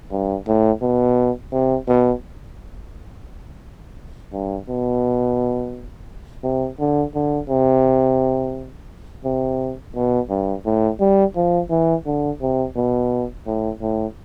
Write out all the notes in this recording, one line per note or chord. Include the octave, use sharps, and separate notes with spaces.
G2
A2
B2
C3
B2
G2
B2
C3
D3
D3
C3
C3
B2
G2
A2
G3
F3
E3
D3
C3
B2
A2
A2